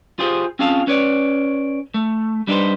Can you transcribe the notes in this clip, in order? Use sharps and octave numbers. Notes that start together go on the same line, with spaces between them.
F4 G4 G#4 C5
C4 C#4 F4 G#4 F5 A5
C#4 B4 C#5 D5
A3
G3 D4 D#4 G#4 B4 C5